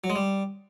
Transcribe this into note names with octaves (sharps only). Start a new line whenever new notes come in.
F#3
G#3
G3